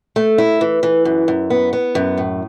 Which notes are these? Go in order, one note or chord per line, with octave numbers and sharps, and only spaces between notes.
A3
E4
E3
E3
F#2
F#2
B3
B3
F#2
A2